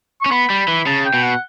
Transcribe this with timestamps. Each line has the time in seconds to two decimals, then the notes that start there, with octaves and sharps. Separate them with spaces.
0.21 C#4 C#6
0.31 B3 B5
0.50 G3
0.68 E3
0.86 C#3 A5
1.05 G5
1.14 B2
1.22 F#5